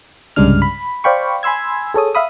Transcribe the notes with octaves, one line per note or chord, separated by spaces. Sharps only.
C2 G2 C#3 G#3 D4 F6
B5
C5 D5 F5 G5 B5 C#6
G#5 B5 C6 E6 G#6
G#4 A4 C#5 D#6
E5 F5 B5 D#6